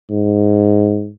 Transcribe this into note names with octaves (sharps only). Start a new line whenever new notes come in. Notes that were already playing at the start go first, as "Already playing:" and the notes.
G#2